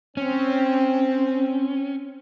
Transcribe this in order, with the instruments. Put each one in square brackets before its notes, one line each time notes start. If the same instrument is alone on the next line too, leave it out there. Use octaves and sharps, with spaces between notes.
[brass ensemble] C4 [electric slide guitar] C#4